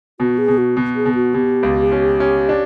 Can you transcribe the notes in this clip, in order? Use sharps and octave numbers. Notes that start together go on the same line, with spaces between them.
B2 F#4
G#4
B2
F#4
B2
G#4
B2
F#4
B2 G4
C#2
C#4
C#4
D4